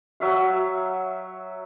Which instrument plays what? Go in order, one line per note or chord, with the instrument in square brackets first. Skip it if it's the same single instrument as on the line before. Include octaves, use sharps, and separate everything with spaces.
[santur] F#3 E5 F5